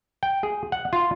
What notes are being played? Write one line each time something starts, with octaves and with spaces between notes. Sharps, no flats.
G5
G#4
F#5
F4